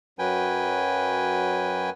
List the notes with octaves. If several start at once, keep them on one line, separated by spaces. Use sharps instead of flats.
F#2 F#3 B4 G5 G#5